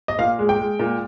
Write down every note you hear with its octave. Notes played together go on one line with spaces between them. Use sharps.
D#5
A#2 F5
G#3
G5
G#3
A#2